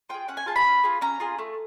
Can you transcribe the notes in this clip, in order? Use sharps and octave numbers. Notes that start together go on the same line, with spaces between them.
F4 G#4 G5
C#4 F#5
G#5
F4 G#4 A5
B5
C#4
F4 G#4
C#4 A#5
F4 G#4
A3